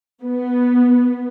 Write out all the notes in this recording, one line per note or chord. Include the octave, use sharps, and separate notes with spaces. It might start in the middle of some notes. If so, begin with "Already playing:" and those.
B3